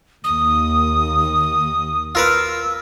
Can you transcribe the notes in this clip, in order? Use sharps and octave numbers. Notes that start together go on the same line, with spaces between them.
D#2 D#6
F4 A#4 B4 E6